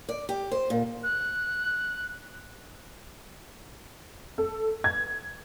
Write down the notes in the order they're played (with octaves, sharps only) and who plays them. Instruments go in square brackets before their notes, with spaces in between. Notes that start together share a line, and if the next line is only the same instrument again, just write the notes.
[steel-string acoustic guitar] D5
G4
C5
A#2
[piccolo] F#6
[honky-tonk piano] A4
G#6